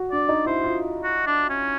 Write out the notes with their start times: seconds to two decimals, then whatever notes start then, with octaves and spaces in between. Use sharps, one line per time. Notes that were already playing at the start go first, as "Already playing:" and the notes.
Already playing: F#4
0.12 D4 D5
0.29 D#4
0.46 E4 C5
0.64 F4
1.04 F#4
1.26 D4
1.50 C#4